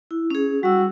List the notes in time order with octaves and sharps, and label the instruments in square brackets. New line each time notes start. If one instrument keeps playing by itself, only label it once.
[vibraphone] E4
C#4 G#4
[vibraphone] G3 E6 [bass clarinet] F#4